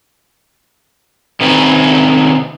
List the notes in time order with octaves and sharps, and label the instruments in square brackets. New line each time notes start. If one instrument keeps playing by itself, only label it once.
[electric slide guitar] C3 D#3 C#4 B4